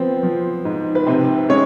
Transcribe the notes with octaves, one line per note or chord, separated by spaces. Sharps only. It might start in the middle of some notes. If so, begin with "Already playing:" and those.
Already playing: F3 B3 C4
F3
G#2
B4
C3 C4 C5
G#3 C#4 C#5